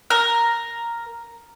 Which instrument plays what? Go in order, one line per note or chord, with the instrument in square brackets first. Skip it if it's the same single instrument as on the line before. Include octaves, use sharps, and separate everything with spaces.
[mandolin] A#4